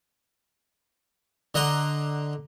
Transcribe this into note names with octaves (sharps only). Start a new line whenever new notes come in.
D3 D#5 F#5 A#5 C6